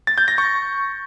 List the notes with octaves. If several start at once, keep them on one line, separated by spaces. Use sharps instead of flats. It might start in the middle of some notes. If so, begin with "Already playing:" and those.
A6
G6
A#6
C#6